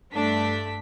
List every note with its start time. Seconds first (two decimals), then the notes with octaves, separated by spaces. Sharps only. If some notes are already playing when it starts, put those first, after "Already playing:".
0.13 G2 A3 D4 B6